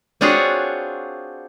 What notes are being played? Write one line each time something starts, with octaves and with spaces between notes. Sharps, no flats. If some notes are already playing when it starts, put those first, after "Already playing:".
C4 D4 F4 F#4 G#4 C#5